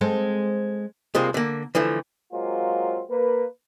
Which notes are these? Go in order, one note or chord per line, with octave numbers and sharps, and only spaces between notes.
G#3 C4 A4
C2 C3 G#3 A#3 F4 C5
D3 A#3
D3 E3 F3 A3
F#3 G#3 A#3 C4 F4
A#3 B4